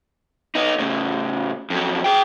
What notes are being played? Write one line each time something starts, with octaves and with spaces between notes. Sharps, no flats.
B3 D#4
A2 C#3
F2 F#3
G#4 G5